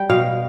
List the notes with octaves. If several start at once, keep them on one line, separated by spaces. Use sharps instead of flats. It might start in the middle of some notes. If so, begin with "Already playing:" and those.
Already playing: G3 G5
B2 F5